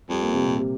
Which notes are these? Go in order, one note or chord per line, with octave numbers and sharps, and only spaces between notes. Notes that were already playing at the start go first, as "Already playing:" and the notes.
F2 G3
A#3
C3
A#2
C3